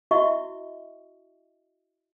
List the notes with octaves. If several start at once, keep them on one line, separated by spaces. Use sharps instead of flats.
E4 F#4 D#5 E5 C#6